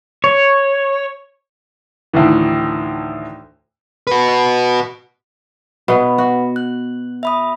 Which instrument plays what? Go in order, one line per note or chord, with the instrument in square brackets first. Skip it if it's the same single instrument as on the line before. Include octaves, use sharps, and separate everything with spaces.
[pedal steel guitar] C#5
[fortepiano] D2 A2 D#3 E3
[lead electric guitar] F#4 B4
[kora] B2 B3 [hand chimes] B4 F#5 B5
[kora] F#4
[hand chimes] F#6
E5 B5 D#6